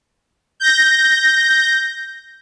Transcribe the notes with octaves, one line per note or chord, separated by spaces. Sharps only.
G6 A#6